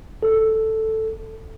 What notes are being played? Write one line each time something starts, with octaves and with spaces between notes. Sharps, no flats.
A4